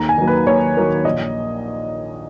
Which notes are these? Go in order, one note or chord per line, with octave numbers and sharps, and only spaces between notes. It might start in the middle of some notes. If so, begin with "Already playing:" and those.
Already playing: D#2 A#5
G#5
D#3 F#3 A#3
B4
D#2 C#5
D#3 F#3 A#3
A#1 D#5